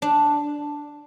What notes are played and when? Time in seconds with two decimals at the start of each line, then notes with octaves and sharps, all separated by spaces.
0.02 D4